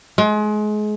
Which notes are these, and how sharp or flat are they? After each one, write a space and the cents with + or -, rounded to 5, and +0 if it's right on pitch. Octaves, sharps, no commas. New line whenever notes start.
G#3 +30